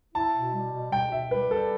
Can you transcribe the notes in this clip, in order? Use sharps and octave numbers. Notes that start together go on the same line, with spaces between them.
E4 A5
B2
G3
B2
B2 G5
B2 E5
G3 B4
G3 A4